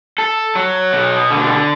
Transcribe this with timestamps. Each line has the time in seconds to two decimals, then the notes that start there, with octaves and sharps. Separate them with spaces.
0.18 A4
0.55 F#3
0.93 B2
1.31 D3